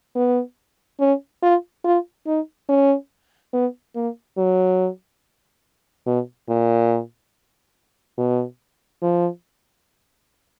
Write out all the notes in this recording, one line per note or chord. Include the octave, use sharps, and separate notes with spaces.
B3
C#4
F4
F4
D#4
C#4
B3
A#3
F#3
B2
A#2
B2
F3